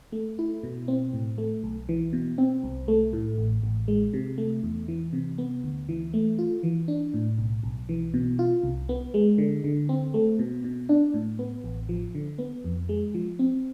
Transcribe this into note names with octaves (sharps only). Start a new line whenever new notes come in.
A3
E4
B2
C4
A2
A3
B1
E3
B2
C4
C2
A3
A2
A1
A1
G#3
C3
A3
E2
E3
C3
B3
D2
E3
A3
F4
E3
D4
A2
B1
B1
E3
B2
F4
C2
B3
G#3
D3
D3
C4
A3
B2
B2
D4
A2
B3
A1
F3
D3
B3
F2
G#3
F3
C4